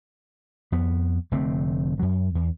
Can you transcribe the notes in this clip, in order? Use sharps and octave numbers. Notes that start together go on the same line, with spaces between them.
F2 B3
F1 D3 A3 C4
F#2 F#3
E2